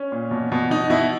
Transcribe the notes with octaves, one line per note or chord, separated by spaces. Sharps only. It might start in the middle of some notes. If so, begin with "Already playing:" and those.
Already playing: C#4
A#2
B2
B2
B2 D#4
B2 E4